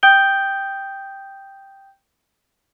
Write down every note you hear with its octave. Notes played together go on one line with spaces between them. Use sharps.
G5 D#6 G6 D7 G7